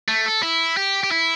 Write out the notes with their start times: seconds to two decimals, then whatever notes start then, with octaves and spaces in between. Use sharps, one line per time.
0.08 A3
0.26 A4
0.43 E4
0.77 G4
1.04 G4
1.11 E4